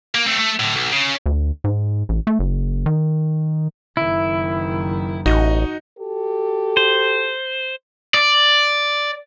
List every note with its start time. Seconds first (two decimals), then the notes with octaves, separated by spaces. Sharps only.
0.15 A#3
0.26 A3 C4
0.39 A3
0.59 A2 D3
0.74 B1
0.92 C#3
1.26 D2
1.64 G#2
2.09 A1
2.27 A3
2.39 F#1
2.86 D#3
3.97 F#1 D#3 E4
5.26 A1 D#4 F#4 D#5
5.99 F#4 G4 A4
6.77 C5
8.14 D5